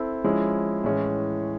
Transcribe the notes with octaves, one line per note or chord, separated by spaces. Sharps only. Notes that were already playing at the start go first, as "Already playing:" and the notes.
Already playing: C4 E4 A4
F3 G#3 C#4 E4
A2 E3 G#3 C#4